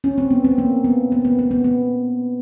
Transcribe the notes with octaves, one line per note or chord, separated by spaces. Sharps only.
C#4
C4
B3
C4
A#3
B3
B3
B3
B3
B3
B3